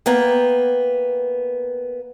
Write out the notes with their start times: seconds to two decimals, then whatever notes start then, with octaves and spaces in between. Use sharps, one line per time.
0.06 A#3 B3 G5